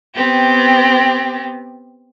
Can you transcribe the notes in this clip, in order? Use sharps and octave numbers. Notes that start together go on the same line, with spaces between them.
B3 C4 G4